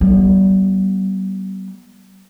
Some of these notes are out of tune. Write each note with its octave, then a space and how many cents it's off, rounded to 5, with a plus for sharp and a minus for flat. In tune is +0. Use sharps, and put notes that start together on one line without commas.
G3 -40 B3 -35